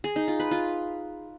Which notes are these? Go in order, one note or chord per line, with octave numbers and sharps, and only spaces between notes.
G#4
D#4
F4
B4
F4